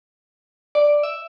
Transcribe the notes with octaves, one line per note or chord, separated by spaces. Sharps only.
D5
E5